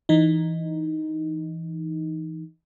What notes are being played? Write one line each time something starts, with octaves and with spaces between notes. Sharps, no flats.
E3 D#4